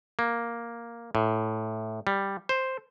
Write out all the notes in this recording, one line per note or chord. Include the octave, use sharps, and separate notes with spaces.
A#3
A2
G3
C5